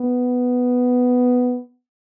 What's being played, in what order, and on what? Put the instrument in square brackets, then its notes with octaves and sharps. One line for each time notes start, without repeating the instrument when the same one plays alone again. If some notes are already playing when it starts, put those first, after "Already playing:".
Already playing: [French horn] B3